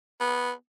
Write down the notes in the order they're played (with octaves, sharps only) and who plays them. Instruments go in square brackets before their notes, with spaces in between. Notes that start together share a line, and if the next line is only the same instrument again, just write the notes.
[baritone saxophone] B3